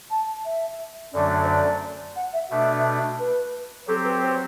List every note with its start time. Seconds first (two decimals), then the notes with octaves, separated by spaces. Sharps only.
0.10 A5
0.45 E5
1.13 F#2 D3 F#3 A3 D4 D5
1.43 C5
1.48 D5
2.16 F#5
2.33 E5
2.50 B2 A3 D4 E5
3.19 B4
3.87 F#3 C4 G4 A4
4.04 B4
4.22 C5